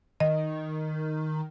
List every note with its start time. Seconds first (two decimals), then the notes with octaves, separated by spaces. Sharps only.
0.20 D#3 D#5